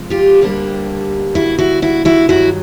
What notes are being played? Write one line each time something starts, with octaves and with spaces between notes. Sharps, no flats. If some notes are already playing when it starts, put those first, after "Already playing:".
Already playing: C3 F3 G#3
F4 G4
D2 D3 G3 A#3 D4
E4 F#4
E4 F#4
E4 F#4
E4 F#4
G2 D#3 F#3 E4 F#4